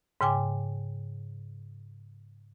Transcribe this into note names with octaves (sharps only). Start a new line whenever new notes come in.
G#2 C#3 G5 G#5 D6